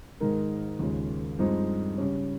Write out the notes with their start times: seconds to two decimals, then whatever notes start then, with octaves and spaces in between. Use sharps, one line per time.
0.20 G#2 D#3 G#3 D#4 A#4
0.79 D#2 C#3 F3 G#3
1.39 G2 F3 G#3 C4 D#4
1.98 C#3 G3 C#4